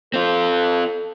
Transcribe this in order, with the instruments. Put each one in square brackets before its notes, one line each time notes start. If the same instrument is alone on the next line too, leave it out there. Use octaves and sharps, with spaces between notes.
[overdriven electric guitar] C4 F4 [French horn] A4